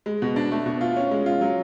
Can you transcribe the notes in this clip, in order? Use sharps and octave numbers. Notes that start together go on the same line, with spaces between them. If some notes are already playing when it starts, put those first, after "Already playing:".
G#3
B2
D4
A3
B2
F4
C#4
G#3
F4
F#3